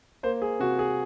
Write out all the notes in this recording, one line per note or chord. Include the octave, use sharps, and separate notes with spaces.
A#3 C5
G#4
C3 F#4
G#4